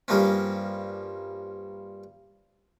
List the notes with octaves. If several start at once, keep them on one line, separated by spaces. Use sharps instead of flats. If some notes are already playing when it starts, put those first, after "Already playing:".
G2 F3 G3 A#3 C4 C#4